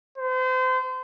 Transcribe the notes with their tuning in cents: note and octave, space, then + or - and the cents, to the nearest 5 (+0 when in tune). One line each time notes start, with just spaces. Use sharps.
C5 -35